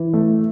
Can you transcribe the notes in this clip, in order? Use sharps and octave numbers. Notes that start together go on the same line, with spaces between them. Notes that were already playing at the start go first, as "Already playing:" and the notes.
Already playing: E3
A3